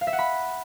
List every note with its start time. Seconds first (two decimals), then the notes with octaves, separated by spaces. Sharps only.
0.01 F5
0.07 E5
0.13 F#5
0.19 B5